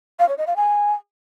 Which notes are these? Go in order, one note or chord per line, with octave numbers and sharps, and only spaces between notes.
F5
C#5
D#5
F5
G#5